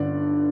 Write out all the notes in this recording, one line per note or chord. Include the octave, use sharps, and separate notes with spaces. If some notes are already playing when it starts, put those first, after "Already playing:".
Already playing: G1 G2 D3 D5